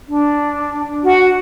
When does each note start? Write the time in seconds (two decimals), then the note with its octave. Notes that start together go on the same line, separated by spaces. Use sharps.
0.08 D4
1.04 F#4